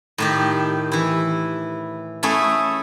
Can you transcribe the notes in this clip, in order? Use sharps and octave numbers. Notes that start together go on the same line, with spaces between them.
A2 D#3 G4
E3 E4
A3 C#4 E4 G#4